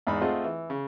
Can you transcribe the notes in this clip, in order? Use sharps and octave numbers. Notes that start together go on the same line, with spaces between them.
E2 G#2 D#4 B5
A3 C4 F4 G#4 D#5 F#5
E3
C#3